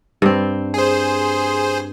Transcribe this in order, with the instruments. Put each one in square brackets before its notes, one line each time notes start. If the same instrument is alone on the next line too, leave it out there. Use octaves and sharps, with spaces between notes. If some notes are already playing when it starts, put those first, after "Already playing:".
[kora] G2 C4
[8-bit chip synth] G#4 C5